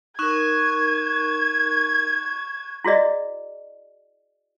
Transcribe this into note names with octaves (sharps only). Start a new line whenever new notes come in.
D#4 A#4 C#6 F#6 G#6 E7
E4 F#4 G#4 D5 D#5